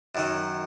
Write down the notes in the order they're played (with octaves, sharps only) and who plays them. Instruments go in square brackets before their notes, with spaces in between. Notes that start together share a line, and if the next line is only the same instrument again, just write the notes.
[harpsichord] F#2 D#3 F#3